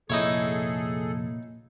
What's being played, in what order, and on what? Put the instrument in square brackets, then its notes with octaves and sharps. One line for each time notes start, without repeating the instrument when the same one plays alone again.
[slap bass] F1 [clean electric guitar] A#2 [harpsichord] D#4 E4 C#5 [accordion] G#4 A4